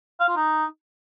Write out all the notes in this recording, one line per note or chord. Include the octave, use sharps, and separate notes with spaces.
F5
F4
D#4